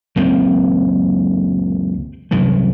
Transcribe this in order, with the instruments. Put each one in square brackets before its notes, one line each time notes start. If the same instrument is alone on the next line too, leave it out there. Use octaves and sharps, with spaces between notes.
[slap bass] C#2 F#2 A#3 C4
C2 F#2 E3